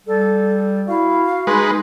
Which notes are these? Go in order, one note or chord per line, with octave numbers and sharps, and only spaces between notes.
G3 A4
E4 F#4 F5
G#3 D#4 B4 C6